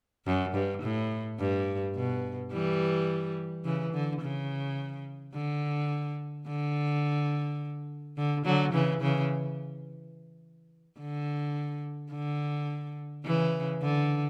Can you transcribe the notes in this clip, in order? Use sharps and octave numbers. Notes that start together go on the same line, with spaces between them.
F#2
G2
A2
G2
B2
E3 G3
C#3 E3
D3
C#3
D3
D3
D3
D3 F#3
C#3 E3
C#3 E3
D3
D3
C#3 E3
D3